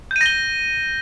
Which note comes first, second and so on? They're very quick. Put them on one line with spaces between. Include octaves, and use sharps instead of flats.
G6 D#7 A#6 G7